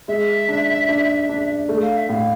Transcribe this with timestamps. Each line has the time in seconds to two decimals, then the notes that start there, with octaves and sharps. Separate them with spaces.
0.08 G#3 E5
0.49 D4
0.89 D4
1.29 D4
1.69 A3
1.82 F5
1.97 E5
2.09 A2 F5